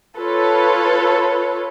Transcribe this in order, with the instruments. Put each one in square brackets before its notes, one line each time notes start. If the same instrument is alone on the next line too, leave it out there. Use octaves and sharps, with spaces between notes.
[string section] F4 A4 B4 C#5